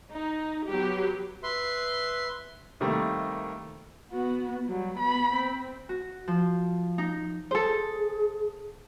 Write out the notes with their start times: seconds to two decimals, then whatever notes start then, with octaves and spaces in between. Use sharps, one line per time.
0.12 D#4
0.68 F#3 B3 G4
1.43 B4 E5 C6
2.80 C3 D#3 G3 A3 A#3
4.12 B3 F#4
4.67 F#3 G3
4.97 B3 B5
5.34 C4
5.89 F#4
6.28 F3
6.98 D#4
7.51 G#4 A4 C5